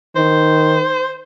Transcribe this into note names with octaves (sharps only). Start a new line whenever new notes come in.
D#3 C5